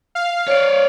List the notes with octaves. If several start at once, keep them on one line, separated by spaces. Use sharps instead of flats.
F5
C#5 D5